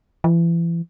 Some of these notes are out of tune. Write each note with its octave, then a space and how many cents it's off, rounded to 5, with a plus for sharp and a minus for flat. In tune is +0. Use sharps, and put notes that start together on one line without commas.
E3 +35